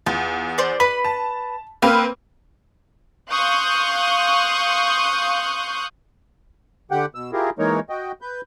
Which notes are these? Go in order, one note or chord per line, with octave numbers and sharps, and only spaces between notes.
E2 F4
C5 D5
B4 B5
A5
A#3 C4 B4 F6
F5 C6 C#6 D#6 F#6 G6
D3 G4 F#5 G5
B2 E6
E4 F4 G4 G#4 A#4
E3 G#3 A#3 D#4 A#4 C#5
F#4 D#5 G5
B4 G6